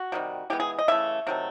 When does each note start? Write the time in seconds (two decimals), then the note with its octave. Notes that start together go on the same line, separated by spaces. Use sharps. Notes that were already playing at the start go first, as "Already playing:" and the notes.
Already playing: F#4
0.12 C3 D#3 G3
0.50 E3 G#3 B3 G4
0.60 G#4
0.79 D#5
0.88 C#3 E3 A3 E5
1.27 C3 D#3 F#3 A3